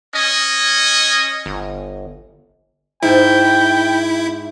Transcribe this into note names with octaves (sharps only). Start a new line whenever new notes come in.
C#4 D#5
G1
G#2 E4 G5 A5